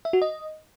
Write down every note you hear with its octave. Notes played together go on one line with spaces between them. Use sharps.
E5
F#4
D#5